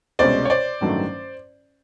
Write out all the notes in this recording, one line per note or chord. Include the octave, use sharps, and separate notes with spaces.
C2 B2 G#3 C#4 C5 D5
C#5
C5 D5
A1 G2 D#3 F#3 A3